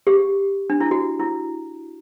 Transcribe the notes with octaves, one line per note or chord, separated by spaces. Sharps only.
G4
D4
E4
F#4
E4